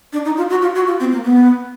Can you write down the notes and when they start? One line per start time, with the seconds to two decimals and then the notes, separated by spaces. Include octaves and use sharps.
0.13 D4
0.25 D#4
0.37 F4
0.50 F#4
0.62 F4
0.75 F#4
0.87 F4
1.00 C4
1.12 A#3
1.24 B3